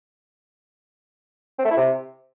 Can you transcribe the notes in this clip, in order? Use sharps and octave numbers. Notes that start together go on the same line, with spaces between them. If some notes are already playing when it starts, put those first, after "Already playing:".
C4
A3
E4
C3